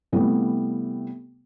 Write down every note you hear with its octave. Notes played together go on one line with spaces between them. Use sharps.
C3 E3 G3 A3 B3